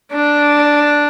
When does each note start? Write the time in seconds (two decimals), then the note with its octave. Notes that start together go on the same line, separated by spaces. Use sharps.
0.13 D4